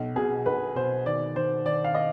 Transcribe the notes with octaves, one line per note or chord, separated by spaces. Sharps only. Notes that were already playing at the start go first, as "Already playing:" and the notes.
Already playing: B1
B2 G#4
B1 B4
B2 C5
D#3 D5
D#3 C5
D#3 D5
F5
D#5